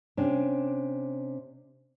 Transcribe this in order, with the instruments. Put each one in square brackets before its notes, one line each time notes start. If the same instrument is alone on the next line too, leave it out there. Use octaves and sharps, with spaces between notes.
[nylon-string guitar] C3 C#4 D4